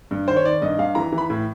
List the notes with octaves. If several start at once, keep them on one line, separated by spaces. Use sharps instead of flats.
G2
D#3 C5
C#5
D#3 D5
G2 D#5
G2 F5
E3 A#5
E3
B5
A2